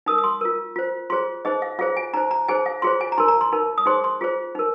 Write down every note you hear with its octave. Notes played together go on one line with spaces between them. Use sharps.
D#4 A#4 D#6
D#6
C6
F4 A#4
F4 C5
F4 G#4 C5 C6
D#4 G#4 C5 D#5
F5
F4 G#4 C5 F5
G#5
D#4 C5 A#5
A#5
D#4 G#4 C5 G#5
F5
F4 G#4 C5 C6
G#5
A#5
D#4 A#4 C6
A#5
C6
D#4 A#4
D#6
D#4 G#4 C5 C6
C6
F4 G#4 C5
D#4 A#4